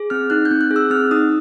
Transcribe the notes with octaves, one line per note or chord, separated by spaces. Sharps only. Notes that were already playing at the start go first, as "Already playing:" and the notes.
Already playing: G#4
C4 F6
D#4 F#6
G6
C4
F#6
G#4
E6
C4 F6
D#4 D#6